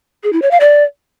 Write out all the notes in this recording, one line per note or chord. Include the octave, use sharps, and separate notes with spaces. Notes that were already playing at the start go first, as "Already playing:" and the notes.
G#4
E4
C#5
F5
D5